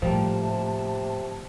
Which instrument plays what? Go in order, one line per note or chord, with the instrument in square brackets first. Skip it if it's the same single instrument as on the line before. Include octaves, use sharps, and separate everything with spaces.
[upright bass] A2 [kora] F3 G3 A#3 [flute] A5
[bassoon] C3